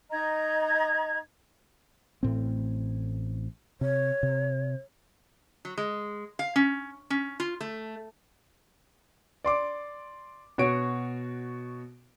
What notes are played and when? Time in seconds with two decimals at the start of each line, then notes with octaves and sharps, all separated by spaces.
0.11 D#4 D#5 A#5 G#6
2.23 A1 A2 C4
3.81 C3 C#5
4.23 C3
5.65 F#3
5.78 G#3
6.39 F5
6.56 C#4
7.10 C#4
7.40 F4
7.61 A3
9.44 D5 C6 D6
10.58 B2 F#4 C#5 D7